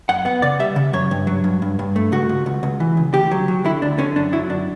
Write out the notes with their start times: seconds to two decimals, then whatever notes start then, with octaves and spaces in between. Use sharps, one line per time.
0.09 F#2 F#5
0.25 B3 F#5
0.42 C#3 D5
0.60 G3 E5
0.76 C#3
0.93 F#2 C#5
1.11 G2
1.27 F#3
1.44 G2
1.62 G2
1.79 G2
1.96 A3
2.12 C#2 F#4
2.29 C#2
2.46 C#2
2.63 C#2
2.80 E3
2.97 C#2
3.14 D2 G4
3.31 F#3
3.48 F#3
3.65 D3 E4
3.82 D2 D4
3.99 D3 C#4
4.16 F#2 D4
4.33 F#3 E4
4.49 F#2 D4